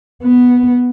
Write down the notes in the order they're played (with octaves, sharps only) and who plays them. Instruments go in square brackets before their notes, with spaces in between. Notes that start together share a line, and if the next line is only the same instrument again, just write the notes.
[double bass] B3